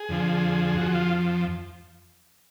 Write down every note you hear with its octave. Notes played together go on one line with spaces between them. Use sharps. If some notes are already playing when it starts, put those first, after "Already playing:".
Already playing: G#4
F2 D3 F3
F2 F3 F#4
F4